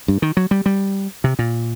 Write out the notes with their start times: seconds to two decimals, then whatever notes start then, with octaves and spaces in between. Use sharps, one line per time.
0.08 G2
0.22 D#3
0.37 F#3
0.51 G3
0.66 G3
1.24 C3
1.39 A#2